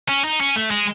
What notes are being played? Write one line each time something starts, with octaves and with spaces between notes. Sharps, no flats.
C#4
D#4
C#4
A3
G#3